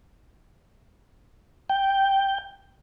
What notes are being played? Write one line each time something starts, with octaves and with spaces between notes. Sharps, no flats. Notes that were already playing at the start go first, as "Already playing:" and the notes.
G5